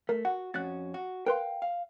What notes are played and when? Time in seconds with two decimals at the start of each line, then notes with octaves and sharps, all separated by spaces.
0.09 A3 A#4
0.25 F#4 F#5
0.54 F2 C#4 F#4 F#6 A6
0.94 F#4
1.26 A#4 B4 F5 G5 C6
1.62 F5